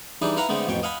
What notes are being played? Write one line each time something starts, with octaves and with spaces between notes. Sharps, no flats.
E3 G3 D4 D#4 G#4
E4 B4 F5 F#5 A#5 B5
D3 G#3 A3 B3 C4
A1 F2 B2 C#5 G5
D#5 F5 F#5 G#5 B5